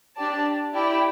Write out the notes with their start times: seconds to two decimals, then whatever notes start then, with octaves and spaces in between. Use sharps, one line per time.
0.17 D4 G4 D5 A5
0.74 E4 G4 D5 G5